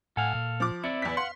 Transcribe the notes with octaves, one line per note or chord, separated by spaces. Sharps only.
A2 A4 F5 F#5 G#5
A#2
F3 D6
C4 E4 D5 E5 C#7
E2 B6
F5 F#5 C6